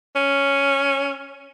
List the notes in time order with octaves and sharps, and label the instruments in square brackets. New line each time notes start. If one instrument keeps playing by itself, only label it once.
[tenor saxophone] C#4